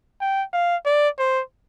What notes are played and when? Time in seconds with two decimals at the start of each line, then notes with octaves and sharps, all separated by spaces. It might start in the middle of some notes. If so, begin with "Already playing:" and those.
0.21 G5
0.53 F5
0.86 D5
1.18 C5